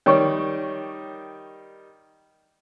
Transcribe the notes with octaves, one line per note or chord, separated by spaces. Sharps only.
D#3 G3 C#5 G5 C#6